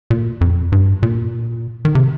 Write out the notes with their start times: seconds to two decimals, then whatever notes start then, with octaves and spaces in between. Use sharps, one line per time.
0.10 A#2
0.41 F2
0.72 G2
1.03 A#2
1.85 D#3
1.95 C3